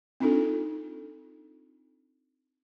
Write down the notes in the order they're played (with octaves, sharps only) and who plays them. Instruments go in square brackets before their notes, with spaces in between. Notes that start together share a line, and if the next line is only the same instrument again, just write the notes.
[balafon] C4 D4 D#4 F4 A4